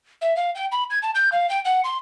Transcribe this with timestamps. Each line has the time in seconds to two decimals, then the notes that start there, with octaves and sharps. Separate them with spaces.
0.21 E5
0.36 F5
0.55 G5
0.72 B5
0.90 G#6
1.03 A5
1.15 G6
1.32 F5
1.49 G5
1.65 F#5
1.84 C6